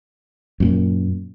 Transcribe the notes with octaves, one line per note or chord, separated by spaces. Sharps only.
F#2 A#2